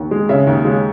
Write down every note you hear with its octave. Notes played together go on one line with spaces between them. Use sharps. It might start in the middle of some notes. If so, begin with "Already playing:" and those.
Already playing: D#2
G#3
C#3 E5
D#2
G#3